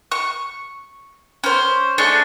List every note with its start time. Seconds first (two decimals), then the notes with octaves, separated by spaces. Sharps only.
0.11 C#6
1.44 C#4 C5
1.98 A3 C#4 D4 G#4